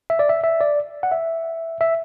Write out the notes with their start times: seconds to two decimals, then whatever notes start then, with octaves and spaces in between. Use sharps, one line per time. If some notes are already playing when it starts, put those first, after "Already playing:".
0.10 E5
0.19 D5
0.29 E5
0.44 E5
0.61 D5
1.03 F#5
1.12 E5
1.81 E5